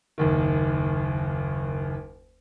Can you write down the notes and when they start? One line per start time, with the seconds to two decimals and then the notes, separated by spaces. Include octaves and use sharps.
0.18 F#1 D#2 D#3